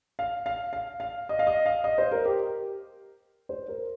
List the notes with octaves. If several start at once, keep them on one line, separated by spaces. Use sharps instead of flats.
F5
F5
F5
F5
D#5
F5
D#5
F5
D#5
C5
A#4
G4
C5
A#4